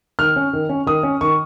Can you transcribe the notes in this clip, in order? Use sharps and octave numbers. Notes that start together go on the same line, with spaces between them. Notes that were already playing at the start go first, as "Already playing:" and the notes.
D#3 F6
C#4
D#3
C#4
D#3 D#6
C#4
D#3 C#6